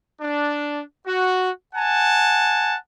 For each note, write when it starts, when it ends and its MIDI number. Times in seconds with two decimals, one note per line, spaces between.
0.20 0.81 62
1.06 1.49 66
1.75 2.75 78
1.75 2.75 80
1.75 2.75 81